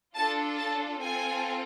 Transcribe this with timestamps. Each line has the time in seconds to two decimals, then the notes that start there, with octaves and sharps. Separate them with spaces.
0.15 D4 F4 A4 A5
0.57 A5
0.99 C4 F4 A4 G#5